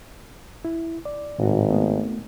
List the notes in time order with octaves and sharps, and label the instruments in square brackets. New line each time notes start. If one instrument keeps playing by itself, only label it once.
[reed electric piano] E4
D5
[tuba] G#1 [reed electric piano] A2 F#4
[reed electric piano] A3 B3